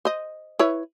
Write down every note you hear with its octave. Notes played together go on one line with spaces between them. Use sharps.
C5 D#5
E4 B4 C#5